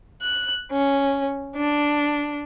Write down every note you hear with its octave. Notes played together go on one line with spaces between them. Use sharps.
F#6
C#4
D4